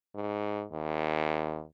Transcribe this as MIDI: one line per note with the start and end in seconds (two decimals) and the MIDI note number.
0.15 0.64 44
0.72 1.63 39